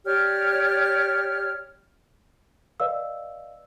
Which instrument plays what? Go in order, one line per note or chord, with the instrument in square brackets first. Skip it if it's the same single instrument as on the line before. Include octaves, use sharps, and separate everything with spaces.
[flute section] G4 C#5 D5 F6
[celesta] B4 D5 D#5 F5 E6